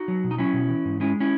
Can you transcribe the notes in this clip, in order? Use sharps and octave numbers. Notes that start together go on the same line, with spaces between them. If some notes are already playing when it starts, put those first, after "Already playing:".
Already playing: D#4 F#4
F#3
B2
D#4
F#3 C#4 E4
B2
E3
G#2
G#3 C#4 E4
C#4 E4